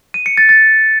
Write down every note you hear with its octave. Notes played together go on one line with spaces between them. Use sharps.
D#7
C#7
A6
A6